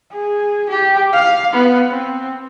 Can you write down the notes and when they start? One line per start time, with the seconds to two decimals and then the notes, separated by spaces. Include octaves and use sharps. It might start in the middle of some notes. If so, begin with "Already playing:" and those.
0.12 G#4
0.69 G4
1.13 F5
1.53 B3
1.89 C4